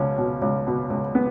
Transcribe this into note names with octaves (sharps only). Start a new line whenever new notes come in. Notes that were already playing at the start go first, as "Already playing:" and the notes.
Already playing: C#2 B2 C#4
B2
C#2
B2
C#2
B3